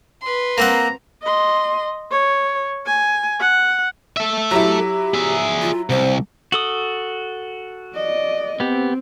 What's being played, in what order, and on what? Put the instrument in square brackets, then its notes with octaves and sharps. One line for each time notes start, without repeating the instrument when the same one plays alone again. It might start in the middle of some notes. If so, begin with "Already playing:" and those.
[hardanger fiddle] B4 C6
[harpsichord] A#3 C4 F#5 [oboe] A#5
[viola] D#5 C6
C#5
G#5
F#5
[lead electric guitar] A4 E5
[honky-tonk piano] F#3 E4 [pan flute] G4
[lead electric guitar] G#4 E5
[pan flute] F4
[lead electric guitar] C2 [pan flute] C5
[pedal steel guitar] F#4 A4 D#6
[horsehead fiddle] D5 D#5
[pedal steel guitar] B3 G4 [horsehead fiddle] C4